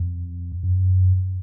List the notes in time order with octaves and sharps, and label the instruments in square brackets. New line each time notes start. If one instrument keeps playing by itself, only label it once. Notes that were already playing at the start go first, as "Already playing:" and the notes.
Already playing: [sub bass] F2
F#2